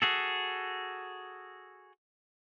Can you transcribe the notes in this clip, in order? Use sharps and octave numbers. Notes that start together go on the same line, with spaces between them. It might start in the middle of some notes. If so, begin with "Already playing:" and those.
F#4 G#4 A4